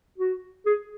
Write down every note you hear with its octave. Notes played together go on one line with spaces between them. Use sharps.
F#4
G#4